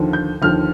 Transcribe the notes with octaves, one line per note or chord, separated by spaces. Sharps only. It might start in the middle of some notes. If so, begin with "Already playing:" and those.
Already playing: D#2 D3 F3
G6
D#2 D3 F3 F6